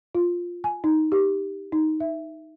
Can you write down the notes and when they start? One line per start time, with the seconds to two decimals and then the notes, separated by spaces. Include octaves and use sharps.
0.15 F4
0.64 G#5
0.84 D#4
1.12 G4
1.72 D#4
2.00 E5